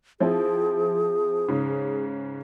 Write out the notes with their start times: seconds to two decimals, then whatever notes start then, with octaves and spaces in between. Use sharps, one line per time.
0.20 F3 C4 E4 G#4
1.48 G#2 C#3